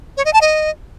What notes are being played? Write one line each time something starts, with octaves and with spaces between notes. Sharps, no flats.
C#5
D#5
A5
D#5